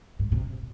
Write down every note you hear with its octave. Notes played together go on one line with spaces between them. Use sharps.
G#2
C3